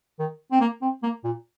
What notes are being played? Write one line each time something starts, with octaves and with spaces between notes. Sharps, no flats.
D#3
C4
A#3
C4
A#3
A#2